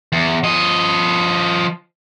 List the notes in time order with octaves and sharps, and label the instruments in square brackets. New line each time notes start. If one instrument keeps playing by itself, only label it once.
[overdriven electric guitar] E2
F3 D#5